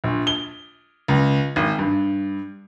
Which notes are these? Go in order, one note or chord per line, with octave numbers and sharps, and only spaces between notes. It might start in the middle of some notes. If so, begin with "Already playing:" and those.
A#1
G7
C#2
G#1
G2